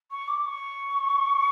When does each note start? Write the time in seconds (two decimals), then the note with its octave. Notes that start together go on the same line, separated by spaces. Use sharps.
0.11 C#6
0.28 D6
0.45 C#6